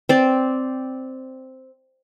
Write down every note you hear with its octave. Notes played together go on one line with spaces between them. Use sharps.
C4 D5